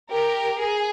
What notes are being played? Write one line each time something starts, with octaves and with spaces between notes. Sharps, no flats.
G4 A#4
G#4